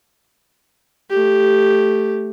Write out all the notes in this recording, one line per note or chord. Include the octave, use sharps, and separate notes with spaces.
A3 G4